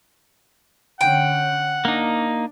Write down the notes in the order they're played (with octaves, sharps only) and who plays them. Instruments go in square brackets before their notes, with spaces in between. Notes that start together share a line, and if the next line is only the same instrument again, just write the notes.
[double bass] D3 C#4 [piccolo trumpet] F#5 [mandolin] G5
[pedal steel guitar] A#3 D#4 [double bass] D4